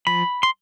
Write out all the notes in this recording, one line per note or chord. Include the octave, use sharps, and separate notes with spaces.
F3 B5
C6